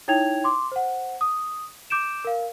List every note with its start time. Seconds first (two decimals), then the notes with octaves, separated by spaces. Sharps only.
0.08 D#4 E4 C#5 G5 G#6 F7
0.44 C6 D6
0.72 C5 F#5
1.21 D#6
1.90 D6 G6 D7 E7
2.25 A#4 F5